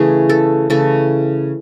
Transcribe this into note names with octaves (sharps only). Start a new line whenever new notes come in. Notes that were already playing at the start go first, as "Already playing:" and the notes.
Already playing: C#3 E3 A3 G#4
A4
C#3 E3 A3 A4